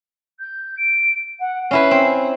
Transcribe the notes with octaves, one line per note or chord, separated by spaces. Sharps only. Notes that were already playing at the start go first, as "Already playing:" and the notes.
G6
D7
F#5
C#4 E4 B4 C7
C4